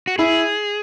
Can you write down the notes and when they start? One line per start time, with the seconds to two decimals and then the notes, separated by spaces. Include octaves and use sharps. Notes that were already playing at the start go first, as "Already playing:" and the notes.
0.07 F#4
0.18 E4 G#4